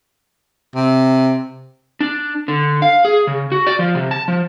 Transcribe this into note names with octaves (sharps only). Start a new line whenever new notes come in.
C3
D4
D3
F5
G#4
C#3
F#4
D5
F3
C3
A5
F3